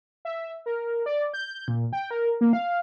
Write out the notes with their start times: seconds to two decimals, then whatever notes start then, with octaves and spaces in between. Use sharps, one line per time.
0.25 E5
0.66 A#4
1.06 D5
1.34 G6
1.68 A#2
1.93 G5
2.11 A#4
2.41 A#3
2.53 F5